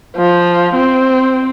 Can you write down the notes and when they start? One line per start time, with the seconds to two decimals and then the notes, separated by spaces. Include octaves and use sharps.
0.17 F3
0.75 C4